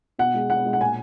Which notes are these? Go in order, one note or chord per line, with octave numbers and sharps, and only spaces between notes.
B2 F#5
G#3
B2 F#5
G#3
F#5
A#2 G#5